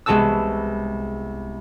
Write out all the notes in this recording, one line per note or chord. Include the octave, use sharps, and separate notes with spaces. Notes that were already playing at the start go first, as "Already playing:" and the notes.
C2 G#3 B3 F#4 A5 E6